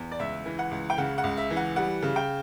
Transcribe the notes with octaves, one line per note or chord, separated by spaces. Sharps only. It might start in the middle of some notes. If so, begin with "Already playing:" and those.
Already playing: E2
D5
C#2 E5
E3
F#5
C#2
G5
C#3 F#5
F#5
C#2
E5
E3
F#5
G3 F#5
C#3
G5